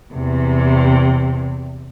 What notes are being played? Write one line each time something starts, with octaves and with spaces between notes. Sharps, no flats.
E2 C3